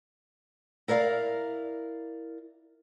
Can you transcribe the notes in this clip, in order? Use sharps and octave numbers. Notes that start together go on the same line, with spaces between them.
E4 A#4 D5 F5